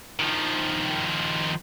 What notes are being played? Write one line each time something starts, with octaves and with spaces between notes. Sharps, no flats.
D#3 F3